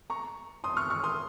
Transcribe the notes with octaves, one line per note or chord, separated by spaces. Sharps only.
A#5 C#6
C6 D#6
C#6 F6
C#6 F6
C6 D#6